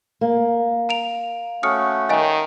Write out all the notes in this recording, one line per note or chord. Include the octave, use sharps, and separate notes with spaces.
A#3
A#5 D7 F7
A3 C#4 F#4 D#6 F6 C#7
D#3 D#5 F5 G#5